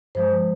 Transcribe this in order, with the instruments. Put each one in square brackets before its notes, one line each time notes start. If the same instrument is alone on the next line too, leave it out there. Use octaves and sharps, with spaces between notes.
[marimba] G2 F3 G#3 C5